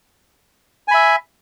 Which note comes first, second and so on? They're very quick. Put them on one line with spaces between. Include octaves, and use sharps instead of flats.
G#5 B5 E5